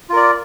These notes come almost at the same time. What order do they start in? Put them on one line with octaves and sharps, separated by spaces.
F4 A#4 D5